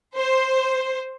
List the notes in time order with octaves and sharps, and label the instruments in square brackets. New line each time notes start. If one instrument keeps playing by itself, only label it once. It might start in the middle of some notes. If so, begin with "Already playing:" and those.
[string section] C5